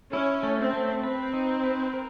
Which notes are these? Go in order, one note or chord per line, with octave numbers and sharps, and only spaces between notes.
C#4 E4
A3
C4
A3
C4 B4
D#4
B4
A#4